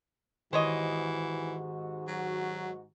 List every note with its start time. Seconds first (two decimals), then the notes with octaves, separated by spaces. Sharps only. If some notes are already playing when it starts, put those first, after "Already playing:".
0.53 G#2 D#3 E3 F#4 G4 C5 C#5 D#5
2.08 F#3